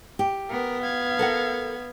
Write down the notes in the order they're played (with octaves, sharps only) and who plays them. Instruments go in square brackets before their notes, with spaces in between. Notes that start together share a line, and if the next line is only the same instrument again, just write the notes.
[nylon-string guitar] G4
[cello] B3 [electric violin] A#4
[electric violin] F5 G#6
[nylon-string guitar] A4 A#4 F#5